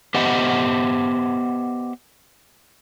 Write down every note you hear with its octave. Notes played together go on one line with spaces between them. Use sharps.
B3 G4 C5 D#5 E5 F#5